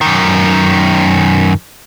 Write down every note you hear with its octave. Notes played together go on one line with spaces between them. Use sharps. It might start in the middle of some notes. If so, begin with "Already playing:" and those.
F#2 D#3